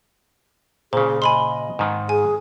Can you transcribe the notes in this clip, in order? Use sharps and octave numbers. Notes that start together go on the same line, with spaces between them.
A#2 C#3 G#4 C5
D#5 G#5 B5 C6
G#2 D#3
G#4 G#5